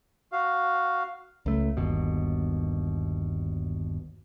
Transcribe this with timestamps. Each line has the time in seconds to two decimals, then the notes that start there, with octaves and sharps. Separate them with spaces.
0.32 F#4 F5
1.46 C#2 A3
1.77 G1 D#2 B2